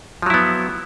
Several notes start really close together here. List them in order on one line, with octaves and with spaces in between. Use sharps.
F3 F#3 E4 B3